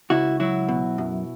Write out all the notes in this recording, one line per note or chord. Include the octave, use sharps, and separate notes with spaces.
C#2 E4 F#4
F#3 E4 F#4
B2
F#2